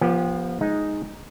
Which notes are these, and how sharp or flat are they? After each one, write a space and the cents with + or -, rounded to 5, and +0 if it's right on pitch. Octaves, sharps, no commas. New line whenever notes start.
F3 +0 B3 -30 G4 +15
G#3 +0 D#4 +0